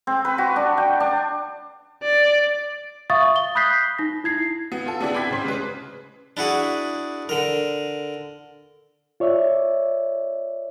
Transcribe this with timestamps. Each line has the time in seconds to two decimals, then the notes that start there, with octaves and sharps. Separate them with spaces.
0.07 C4
0.25 B4
0.38 F#4
0.56 D4
0.78 G5
1.00 D4
2.03 D5
3.10 E5 F5 C#6 D#6 A6
3.36 G7
3.55 B5 D#6 F#6 G6 B6 C7
3.99 D#4 A#6
4.24 E4 G#6 C7
4.72 B3
4.86 F4 A4
5.01 B3 C4 D4 E4 G#4
5.14 G5 B5 D6 G#6 B6
5.29 C2 C#3 C5
5.45 C#3 G#3 B4
6.37 D4 E4 F#4 G#4
7.29 D3 A#4
9.20 F4 C#5 D5 E5